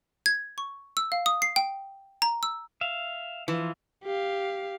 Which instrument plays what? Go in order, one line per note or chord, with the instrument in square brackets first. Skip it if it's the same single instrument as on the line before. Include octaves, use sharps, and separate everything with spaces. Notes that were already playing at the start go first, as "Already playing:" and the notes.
[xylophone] G#6
C#6
E6
F5
D#6
C7
G5
A#5
E6
[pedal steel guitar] E5 F5
[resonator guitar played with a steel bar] E3 [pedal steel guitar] F3 F4
[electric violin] G4 F5